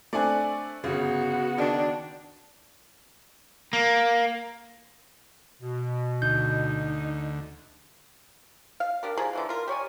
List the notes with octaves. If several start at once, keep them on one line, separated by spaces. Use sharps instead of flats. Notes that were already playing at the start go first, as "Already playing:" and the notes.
A3 C4 D4 D5 G#5 F#6
G1 C#3 B3 F#4
D#3 D4
A#3
B2
D2 D#4 G6
F5
D4 G4 A#4
F3 G#4 A#5
D3 E3 F3
F4 A#4
G4 C#5 D5 G#5